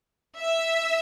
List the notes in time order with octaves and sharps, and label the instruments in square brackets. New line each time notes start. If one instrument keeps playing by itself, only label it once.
[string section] E5